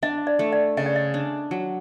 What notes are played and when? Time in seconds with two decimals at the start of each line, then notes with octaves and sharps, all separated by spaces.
0.03 D4 D#5
0.27 D5
0.39 A3
0.53 D5
0.77 C#3 D#5
0.86 D5
0.96 D#5
1.14 D4
1.51 F#3